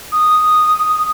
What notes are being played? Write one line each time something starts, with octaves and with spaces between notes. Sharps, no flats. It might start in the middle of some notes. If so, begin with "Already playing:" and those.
D#6